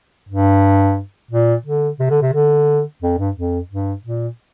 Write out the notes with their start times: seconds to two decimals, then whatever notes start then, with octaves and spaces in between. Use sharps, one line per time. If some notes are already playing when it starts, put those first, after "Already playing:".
0.29 G2
1.31 A#2
1.65 D3
1.99 C3
2.10 D3
2.22 C3
2.34 D3
3.02 F2
3.18 G2
3.36 F2
3.70 G2
4.04 A#2